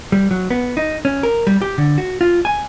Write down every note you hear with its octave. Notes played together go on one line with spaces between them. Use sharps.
G3
F#3
B3
D#4
C#4
A#4
G3
G4
D3
F#4
F4
G#5